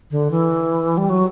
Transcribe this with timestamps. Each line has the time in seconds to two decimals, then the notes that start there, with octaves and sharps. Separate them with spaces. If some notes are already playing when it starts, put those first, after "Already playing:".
0.11 D3
0.31 E3
0.97 G3
1.09 F#3